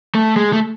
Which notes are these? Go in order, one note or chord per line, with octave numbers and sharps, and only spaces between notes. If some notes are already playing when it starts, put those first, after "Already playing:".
A3
G#3
A3